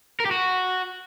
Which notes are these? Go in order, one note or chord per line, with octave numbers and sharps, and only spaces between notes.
A#4
G4
F#4